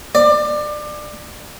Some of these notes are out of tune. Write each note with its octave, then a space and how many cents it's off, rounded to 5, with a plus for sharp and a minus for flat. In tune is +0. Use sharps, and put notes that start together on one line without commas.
D5 +25